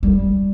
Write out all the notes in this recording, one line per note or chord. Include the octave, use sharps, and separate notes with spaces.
G3